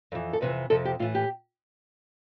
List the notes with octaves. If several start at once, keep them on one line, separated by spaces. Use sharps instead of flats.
F2 E3
A4
F2 C3 E3 B4
F2 C3 F3 A4
G4
A2 E3 F4
G4